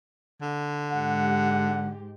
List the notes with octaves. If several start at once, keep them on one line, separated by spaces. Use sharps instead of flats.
D3
G#2 G#3 G4 F#5